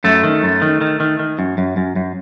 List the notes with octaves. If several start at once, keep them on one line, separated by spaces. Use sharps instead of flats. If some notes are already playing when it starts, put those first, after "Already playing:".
F#2 A3
D#3
F#2
D#3
D#3
D#3
D#3
F#2
F#2
F#2
F#2